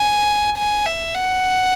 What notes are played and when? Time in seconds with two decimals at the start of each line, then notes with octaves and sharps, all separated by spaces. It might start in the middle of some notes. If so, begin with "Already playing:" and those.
Already playing: G#5
0.58 G#5
0.86 E5
1.15 F#5